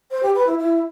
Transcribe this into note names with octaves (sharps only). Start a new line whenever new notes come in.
C5
G4
B4
E4
E4